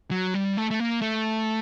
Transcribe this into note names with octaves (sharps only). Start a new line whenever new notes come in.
F#3
G3
A3
A3
A#3
A3